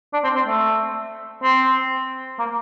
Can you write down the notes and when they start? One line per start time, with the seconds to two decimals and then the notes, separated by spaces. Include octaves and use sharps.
0.13 D4
0.24 C4
0.36 C4
0.46 A3
1.43 C4
2.39 A#3